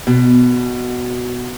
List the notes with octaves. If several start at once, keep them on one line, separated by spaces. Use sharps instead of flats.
B2